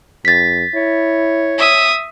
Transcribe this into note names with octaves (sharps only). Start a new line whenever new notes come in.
F2 A6 B6
E4 C#5
E5 D#6